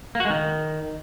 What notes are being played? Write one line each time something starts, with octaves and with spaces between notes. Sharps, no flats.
A#3
F#4
G#3
D#3